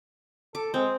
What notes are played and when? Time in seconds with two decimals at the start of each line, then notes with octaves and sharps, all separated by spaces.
0.55 A4 D6
0.74 G#3 C4